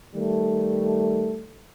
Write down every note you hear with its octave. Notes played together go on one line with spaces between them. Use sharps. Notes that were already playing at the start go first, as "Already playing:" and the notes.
D#3 G3 A3